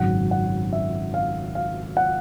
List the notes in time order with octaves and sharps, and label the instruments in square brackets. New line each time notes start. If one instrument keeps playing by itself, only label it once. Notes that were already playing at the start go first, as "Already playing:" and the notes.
Already playing: [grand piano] G#1 F#2 C#3 F#3 F#5
F#5
E5
F5
F5
F#5